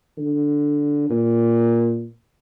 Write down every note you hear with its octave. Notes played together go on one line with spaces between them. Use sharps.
D3
A#2